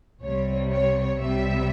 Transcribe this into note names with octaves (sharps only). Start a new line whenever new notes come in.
C2 C3 G3 C#5
C#5
C2 C3 G3 E5